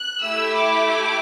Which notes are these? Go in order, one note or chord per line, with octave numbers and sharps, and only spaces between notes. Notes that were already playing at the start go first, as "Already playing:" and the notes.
Already playing: F#6
A3 E4 G4 E6
D6